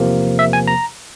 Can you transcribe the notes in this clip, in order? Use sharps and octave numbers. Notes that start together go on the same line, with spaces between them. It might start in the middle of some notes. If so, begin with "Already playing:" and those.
Already playing: E2 C3 F3 A#3
E5
G#5
A#5